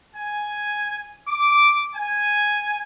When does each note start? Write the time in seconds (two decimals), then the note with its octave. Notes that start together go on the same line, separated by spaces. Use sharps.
0.15 G#5
1.28 D6
1.95 G#5